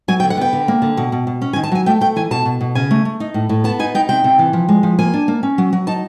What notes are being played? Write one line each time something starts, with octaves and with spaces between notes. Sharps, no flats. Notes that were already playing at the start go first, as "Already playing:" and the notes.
F#3 G#5
G5
D3
F#5
B3 G5
D3
A#3
D3
B2
B2
B2
C#4
G#5
D#3
A5
F#3 G#5
A3 G5
A3 G5
E3 G#5
B2 A5
B2
B2
C#3 G#5
A3
A3
D#4
A2
A2
B3 A5
D#4 G#5
D#4 G5
C3 G5
C3
E3
F3
G#3
F3
A#3 G#5
D4
A#3
C#4
F#3
F#3
D#4 A5